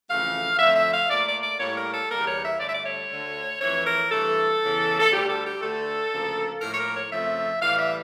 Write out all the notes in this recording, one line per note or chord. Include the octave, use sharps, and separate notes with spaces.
F2 C#3 E3 A3 F5
F2 D3 F3 A3 E5
E5
F5
A#2 A3 D5
D5
D5
A2 G3 A#3 C#5
A#4
A4
E2 D3 G3 A#3 A#4
C#5
E5
G2 D3 A3 D5
E5
D5
C#5
D2 D3 A3
F2 E3 A3 C#5
A#4
G2 E3 A3 A4
E2 C#3 E3
A4
D2 D3 G3 G4
A4
G4
D2 D3 A3 A4
D2 C#3 F3 A#3
A2 F3 A#3 A#4
C#5
A#4
C#5
F2 C#3 F3 A3 E5
A2 E3 G3 F5
E5